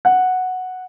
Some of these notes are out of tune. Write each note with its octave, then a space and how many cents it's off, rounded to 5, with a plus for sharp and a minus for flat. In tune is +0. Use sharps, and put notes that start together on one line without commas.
F#5 -5